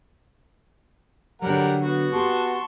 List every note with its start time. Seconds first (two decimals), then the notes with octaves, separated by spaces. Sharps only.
1.42 D3 F#3 G3 A#4 F#5
1.82 B3 F#4
2.13 G4 G#4 A5 C6 C#6